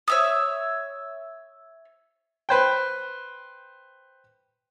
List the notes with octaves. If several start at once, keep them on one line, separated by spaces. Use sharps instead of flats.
C#5 E5 D#6
B4 C5 G5